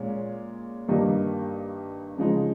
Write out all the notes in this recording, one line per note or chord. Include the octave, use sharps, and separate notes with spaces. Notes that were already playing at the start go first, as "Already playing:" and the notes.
Already playing: A#2 G#3 C#4
G2 D#3 G3 A#3 D#4
C#3 F3 G#3 D#4